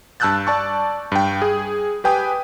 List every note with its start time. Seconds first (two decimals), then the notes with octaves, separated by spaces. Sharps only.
0.20 G2 A5 E6 F#6 G6 A6
0.47 D5 A5 C#6
1.12 G2 G5
1.42 G#4
2.04 G4 B4 G5 G#5 D#6